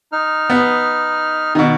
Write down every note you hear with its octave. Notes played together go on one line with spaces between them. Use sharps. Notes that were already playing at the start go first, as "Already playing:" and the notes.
D#4 F6
B3
B2 D#3